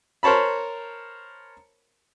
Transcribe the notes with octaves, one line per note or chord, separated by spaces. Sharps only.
A#4 C5 C#5 A5 B5